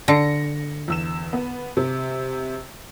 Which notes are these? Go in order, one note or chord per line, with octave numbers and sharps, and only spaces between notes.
D3 A#6 C#7
E2 E6 E7
B3
C3